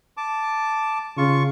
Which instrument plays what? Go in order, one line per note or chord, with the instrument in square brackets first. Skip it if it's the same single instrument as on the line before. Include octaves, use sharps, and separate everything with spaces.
[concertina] A5 D6
[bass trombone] C#3 [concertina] F4 C#6